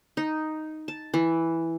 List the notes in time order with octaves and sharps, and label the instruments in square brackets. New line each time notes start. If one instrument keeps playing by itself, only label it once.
[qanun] D#4
A5
E3